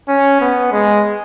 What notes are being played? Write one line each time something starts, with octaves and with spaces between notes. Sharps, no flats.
C#4
B3
G#3